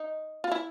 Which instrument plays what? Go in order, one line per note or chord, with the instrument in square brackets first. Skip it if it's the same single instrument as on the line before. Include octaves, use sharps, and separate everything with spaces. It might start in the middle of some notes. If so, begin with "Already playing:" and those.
Already playing: [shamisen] D#4
F4
E4